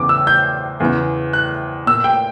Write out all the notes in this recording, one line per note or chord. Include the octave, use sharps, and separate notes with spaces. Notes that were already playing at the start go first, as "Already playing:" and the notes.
Already playing: E2 C#3 E3 D6
E6
G6
E2 C#3 E3
F#6
A#2 E6
G5